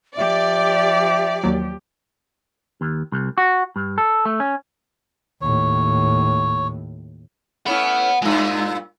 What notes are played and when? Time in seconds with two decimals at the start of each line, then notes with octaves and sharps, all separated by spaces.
0.17 F3 G4 D5 E5
1.43 D#2 F#3
2.81 D#2
3.12 C2
3.38 F#4
3.76 G2
3.98 A4
4.25 A3
4.40 C#4
5.42 D#2 A2 C#5
7.66 A3 C#4 E4 F#5 B5
8.22 G2 A#2 G#3